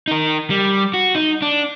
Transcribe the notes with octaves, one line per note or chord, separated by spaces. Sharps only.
D#4 A#4
G3
F#4
D#4
D4